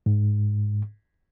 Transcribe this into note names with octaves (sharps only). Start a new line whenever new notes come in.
G#2